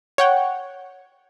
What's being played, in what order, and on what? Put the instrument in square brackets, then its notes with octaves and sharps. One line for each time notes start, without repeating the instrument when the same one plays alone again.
[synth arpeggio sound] C#5 F#5 G5